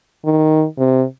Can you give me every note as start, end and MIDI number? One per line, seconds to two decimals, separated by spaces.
0.25 0.65 51
0.78 1.04 48